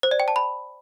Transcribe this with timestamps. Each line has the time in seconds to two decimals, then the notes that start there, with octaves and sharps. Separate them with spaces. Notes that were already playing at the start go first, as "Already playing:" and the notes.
0.03 C5
0.11 D5
0.20 G5
0.28 A5
0.36 B5